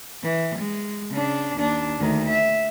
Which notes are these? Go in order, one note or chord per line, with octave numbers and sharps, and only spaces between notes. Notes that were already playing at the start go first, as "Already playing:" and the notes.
E3
G#3
C#3 D4
D#2 D4
D2 D#3
E5